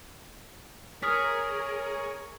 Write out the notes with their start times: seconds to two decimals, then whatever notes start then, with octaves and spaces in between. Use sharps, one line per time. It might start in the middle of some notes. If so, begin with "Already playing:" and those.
1.03 G#4 A#4 C#5 D#6 F6 B6